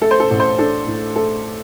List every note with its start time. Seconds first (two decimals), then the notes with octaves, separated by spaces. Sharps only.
0.01 A3 A4
0.11 C5
0.20 A4
0.30 A1
0.40 C5
0.59 D4 A4
0.87 A2
1.16 A3 A4